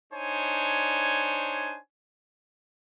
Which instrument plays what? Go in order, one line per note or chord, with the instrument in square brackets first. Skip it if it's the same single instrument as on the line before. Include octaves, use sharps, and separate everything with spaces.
[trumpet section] D4 D#4 C5 C#5 G#5